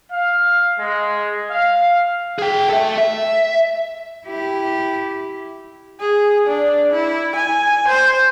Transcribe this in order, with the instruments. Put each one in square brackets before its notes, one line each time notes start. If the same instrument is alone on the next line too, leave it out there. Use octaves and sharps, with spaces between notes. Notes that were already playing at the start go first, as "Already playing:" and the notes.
[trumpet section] F5
G#3
F5
[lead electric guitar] G#4 G5
A4 E5
E5
[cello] E4 G4
[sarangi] G#4
D4
E4
G#5
C5